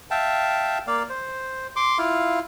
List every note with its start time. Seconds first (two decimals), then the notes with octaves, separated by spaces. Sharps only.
0.11 E5 F5 G5 A5
0.87 A#3 D5 F5
1.10 C5
1.76 C6 D6
1.98 E4 F4 F5